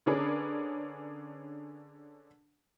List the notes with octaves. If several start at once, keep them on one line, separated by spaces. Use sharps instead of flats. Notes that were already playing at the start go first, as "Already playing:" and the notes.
D3 C#4 D4 G#4 A#4 B4